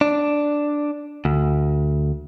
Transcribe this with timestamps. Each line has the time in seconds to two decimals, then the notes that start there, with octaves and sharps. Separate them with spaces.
0.01 D4
1.25 D2